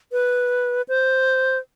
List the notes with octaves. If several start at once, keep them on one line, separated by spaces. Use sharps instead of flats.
B4
C5